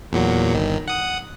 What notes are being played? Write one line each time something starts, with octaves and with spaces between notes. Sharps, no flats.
E2 A#2 F#3
G1 D#3
F#5 D#6